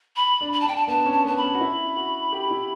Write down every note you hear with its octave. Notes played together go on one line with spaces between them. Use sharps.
B5
D4
B5
A5
D4
G5
A5
B3 A5
C#4
A5
B3 A5
B5
C#4
F#4
E4
F#4
G4
E4